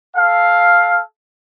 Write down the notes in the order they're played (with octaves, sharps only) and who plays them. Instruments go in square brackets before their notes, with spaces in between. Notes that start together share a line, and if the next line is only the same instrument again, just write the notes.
[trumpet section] A4 F5